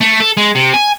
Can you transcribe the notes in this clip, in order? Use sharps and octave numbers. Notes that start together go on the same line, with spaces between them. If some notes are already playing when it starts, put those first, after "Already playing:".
A3
A4
G#3
C3
G#5